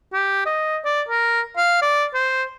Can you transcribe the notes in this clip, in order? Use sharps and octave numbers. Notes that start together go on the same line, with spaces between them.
G4
D#5
D5
A#4
F5
D5
C5